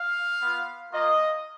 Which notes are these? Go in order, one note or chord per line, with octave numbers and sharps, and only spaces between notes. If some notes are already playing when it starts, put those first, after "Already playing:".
Already playing: F5
B3 F4
A#3 F4 D#5